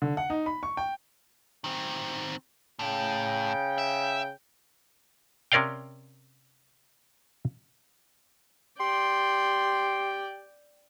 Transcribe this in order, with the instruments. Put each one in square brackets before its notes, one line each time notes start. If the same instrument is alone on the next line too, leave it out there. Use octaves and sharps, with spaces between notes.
[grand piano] D3
F#5
D#4
B5
C#6
G5
[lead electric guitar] D#3 C4
[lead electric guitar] A2 [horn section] C#3 G5
[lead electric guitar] E5
[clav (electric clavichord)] C3 C#4 A#4 D5 F5 G5
[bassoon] G4 [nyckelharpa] D5 G5 [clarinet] C6